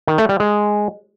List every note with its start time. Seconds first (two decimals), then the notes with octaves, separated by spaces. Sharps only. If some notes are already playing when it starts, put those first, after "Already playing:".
0.07 D#3
0.18 A3
0.29 G3
0.40 G#3